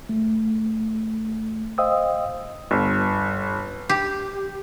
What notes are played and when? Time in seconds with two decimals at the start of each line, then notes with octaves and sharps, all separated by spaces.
0.09 A3
1.78 C5 D#5 F5 G5 D#6 E6
2.71 G1
3.89 G4